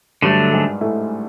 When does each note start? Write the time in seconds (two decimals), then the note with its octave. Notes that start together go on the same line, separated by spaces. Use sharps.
0.22 G2 D3 F#3 G3 A3 D4
0.53 G#2 G#3
0.81 A2 A3